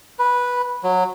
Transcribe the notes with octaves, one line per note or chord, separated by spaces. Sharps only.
B4
F#3